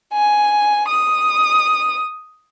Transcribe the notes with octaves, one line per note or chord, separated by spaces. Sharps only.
G#5
D#6